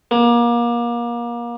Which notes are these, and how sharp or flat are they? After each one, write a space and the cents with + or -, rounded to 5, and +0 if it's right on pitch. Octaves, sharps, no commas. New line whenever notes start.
A#3 +30